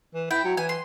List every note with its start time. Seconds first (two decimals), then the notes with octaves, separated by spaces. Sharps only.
0.14 E3
0.31 E4 G5
0.45 F#3
0.57 E3 G#5
0.69 C6